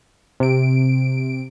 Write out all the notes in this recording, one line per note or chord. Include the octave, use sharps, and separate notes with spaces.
C3 D7